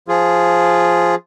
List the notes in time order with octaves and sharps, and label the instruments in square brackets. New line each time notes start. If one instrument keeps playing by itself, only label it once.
[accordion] F3 F4 G#4